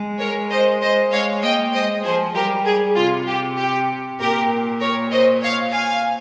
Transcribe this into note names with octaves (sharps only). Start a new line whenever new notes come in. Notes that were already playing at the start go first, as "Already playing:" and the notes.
Already playing: G#3
A#4 C#5
C5 D#5
C5 D#5
G#3 C#5 F5
A#3 D#5 G5
G#3 C5 D#5
F3 G#4 C5
G3 G4 A#4
G#4
C3 F4
G4
G4
A#2 G4 A#4
A#4 C#5
C5 D#5
C#5 F5
F5 G#5